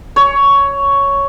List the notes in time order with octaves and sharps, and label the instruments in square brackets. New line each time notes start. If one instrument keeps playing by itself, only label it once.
[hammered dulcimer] C#5